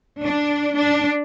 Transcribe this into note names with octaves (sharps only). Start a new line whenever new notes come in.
D4
D4